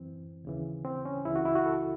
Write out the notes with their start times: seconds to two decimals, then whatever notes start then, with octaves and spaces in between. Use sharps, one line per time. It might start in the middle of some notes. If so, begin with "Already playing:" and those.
Already playing: F#2 E3 C4
0.45 D#2 C#3 E3
0.85 C4
1.05 C#4
1.25 C#2 C#3 E3 E4
1.36 F#4
1.45 E4
1.55 F#4
1.66 A4